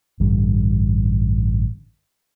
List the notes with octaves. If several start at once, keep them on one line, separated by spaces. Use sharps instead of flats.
A1 G2 D3 G3